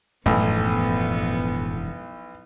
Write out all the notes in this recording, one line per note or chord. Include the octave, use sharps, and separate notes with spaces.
E1 B1 F#2 A2 F3 B3